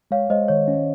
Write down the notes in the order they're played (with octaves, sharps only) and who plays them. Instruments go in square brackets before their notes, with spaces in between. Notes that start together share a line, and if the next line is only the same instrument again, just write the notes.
[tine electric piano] G#3 [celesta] C#5 F5
[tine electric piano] G#3 [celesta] C5 D#5
[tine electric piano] D#3 [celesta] C#5
[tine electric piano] C#4